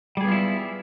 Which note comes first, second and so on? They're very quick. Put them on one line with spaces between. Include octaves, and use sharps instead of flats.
G3 G#4 B3 F4 E4